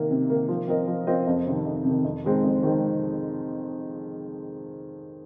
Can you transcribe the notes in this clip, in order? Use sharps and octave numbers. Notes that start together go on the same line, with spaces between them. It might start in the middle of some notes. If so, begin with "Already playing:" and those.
Already playing: C3 D#3 A#3
C3
D#3 A#3
F3
C4 F4 A#4 D#5
F3
C4 F4 A#4 D#5
F2
C3 D#3
F2
C3 D#3
F2
D#3 G#3 C4
F2
D#3 G#3 C4